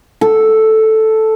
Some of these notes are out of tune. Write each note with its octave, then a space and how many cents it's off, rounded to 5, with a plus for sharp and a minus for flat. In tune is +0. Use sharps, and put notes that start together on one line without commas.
A4 +0